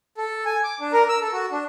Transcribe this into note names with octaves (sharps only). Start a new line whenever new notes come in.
A4
G#5
D6
D4
A#4
E6
A4
F#4
D4